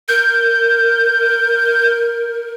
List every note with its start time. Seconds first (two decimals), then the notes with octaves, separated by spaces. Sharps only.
0.09 A#4 G6